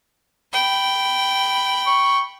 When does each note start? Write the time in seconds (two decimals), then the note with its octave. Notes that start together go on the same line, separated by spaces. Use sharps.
0.52 G5 B5
1.87 C#6